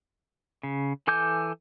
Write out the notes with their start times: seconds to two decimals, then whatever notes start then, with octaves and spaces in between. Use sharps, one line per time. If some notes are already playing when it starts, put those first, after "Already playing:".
0.63 C#3
1.07 E3 A4 G#5 D6 G6